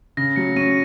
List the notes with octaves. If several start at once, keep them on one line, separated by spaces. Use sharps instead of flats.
C#3 A#6
F#3 C#7
C#4 D#7